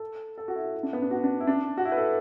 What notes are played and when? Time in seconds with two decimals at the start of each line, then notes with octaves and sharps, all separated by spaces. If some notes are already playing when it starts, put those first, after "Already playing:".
Already playing: A4
0.38 A4
0.48 F#4
0.55 E4
0.75 E4
0.83 D4
0.93 B3
1.02 D4
1.11 F#4
1.24 D4
1.40 E4
1.47 D4
1.77 F#4
1.85 E4
1.92 B4
1.97 A4